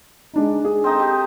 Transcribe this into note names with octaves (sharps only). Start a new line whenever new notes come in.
G#3 D4 D#4
G#4
C4 D#4 A4
G4